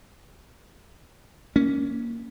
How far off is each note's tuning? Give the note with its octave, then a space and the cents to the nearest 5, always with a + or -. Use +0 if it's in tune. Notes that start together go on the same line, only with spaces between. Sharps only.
A#3 +0 C#4 +5